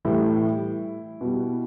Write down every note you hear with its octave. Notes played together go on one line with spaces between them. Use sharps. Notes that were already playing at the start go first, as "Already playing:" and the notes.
A2 E3 G3 E4
B2 G3